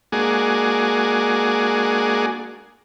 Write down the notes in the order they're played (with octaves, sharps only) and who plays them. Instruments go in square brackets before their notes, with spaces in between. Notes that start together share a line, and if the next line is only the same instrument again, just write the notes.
[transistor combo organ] G#3 A#3 D4 F#4 G#4